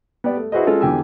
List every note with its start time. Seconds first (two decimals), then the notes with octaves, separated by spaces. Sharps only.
0.24 B3 G4 D5
0.37 A3
0.52 E4 F#4 G#4 B4 C5 D#5
0.67 G#3 C#4 F4 A4
0.81 E2 D3 G4 G5 G#5 E6